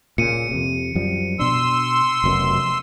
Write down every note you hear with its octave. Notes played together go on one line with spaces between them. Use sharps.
A#2 C#3 C#7 D#7
F2 C3
F#2 F3 G3
B2 D4 C6 E6
F1 F#2 B2